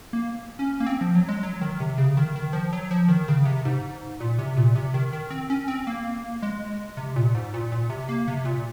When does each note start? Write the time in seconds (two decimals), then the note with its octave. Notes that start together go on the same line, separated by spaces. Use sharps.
0.13 A#3
0.59 C#4
0.80 A#3
0.86 C4
1.01 F3
1.15 F#3
1.28 G#3
1.43 F#3
1.61 D#3
1.80 C3
1.98 C#3
2.17 D#3
2.36 D#3
2.53 F3
2.73 F#3
2.91 F3
3.08 D#3
3.28 C#3
3.46 C3
3.65 G#2
4.20 A#2
4.38 C3
4.56 A#2
4.75 C3
4.94 D#3
5.13 D#3
5.30 C4
5.50 C#4
5.68 C4
5.87 A#3
6.42 G#3
6.97 C3
7.16 A#2
7.35 G#2
7.54 A#2
7.72 A#2
7.90 C3
8.09 A#3
8.28 C3
8.45 A#2